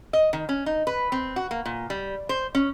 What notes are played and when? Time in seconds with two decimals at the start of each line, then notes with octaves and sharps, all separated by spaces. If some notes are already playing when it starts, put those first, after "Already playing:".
0.13 D#5
0.33 D#3
0.49 C#4
0.66 D#4
0.87 B4
1.12 C4
1.36 F#4
1.51 A#3
1.66 A#2
1.90 G3
2.29 C5
2.55 C#4